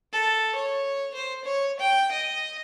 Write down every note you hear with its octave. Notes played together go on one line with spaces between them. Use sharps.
A4
C#5
C5
C#5
G5
D#5